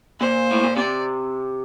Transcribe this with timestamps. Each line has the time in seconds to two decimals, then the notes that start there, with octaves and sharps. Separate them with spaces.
0.20 A#2 C5
0.51 A2
0.64 A#2
0.77 C3 D5